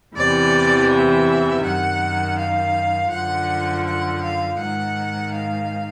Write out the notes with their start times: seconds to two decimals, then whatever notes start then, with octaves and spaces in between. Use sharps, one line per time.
0.15 E2 C3 E3 D5
0.90 E5
1.63 F#2 D#3 F#5
2.37 F5
3.11 F#2 D3 F3 F#5
3.85 F#5
4.22 F5
4.59 G#2 D#3 F#5
5.33 F5